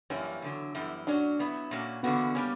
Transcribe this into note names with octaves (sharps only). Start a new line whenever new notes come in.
F#2 E3 G3 A#3 C#4
E2 D3 F#3
F#2 E3 G3 B3
F#3 C#4 D4 F#4
F#3 B3 E4
A#2 A#3 C#4 F#4
E2 D3 A#3 B3 C#4 F#4
G3 A#3 C#4